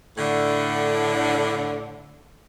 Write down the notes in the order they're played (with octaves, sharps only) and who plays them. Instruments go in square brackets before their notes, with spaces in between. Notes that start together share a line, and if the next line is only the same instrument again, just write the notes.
[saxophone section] A2 D3